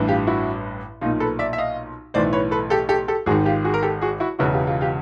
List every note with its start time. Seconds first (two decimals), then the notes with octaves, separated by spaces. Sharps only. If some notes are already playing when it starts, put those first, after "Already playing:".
Already playing: A1 G2 E3
0.08 F4 G4
0.27 E4 F#4
1.01 B1 A#2 D#4 F4
1.20 A4 B4
1.39 D5 E5
1.53 E5
1.58 D#5 F5
2.14 B1 A2 E3 C5 D5
2.33 B4 C#5
2.51 A4 B4
2.70 G4 A4
2.89 G4 A4
3.08 G4 A4
3.26 G#1 G#2 D#3 F#4 G#4
3.45 F4 G4
3.64 F#4 G#4
3.74 A#4
3.83 G4 A4
4.01 F#4 G#4
4.20 E4 F#4
4.39 E1 E2 C#3 E3 E4 F#4
4.53 F4 G4
4.67 F4 G4
4.81 F4 G4